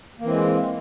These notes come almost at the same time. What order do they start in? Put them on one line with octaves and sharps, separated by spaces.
A#3 E3 C4 G#3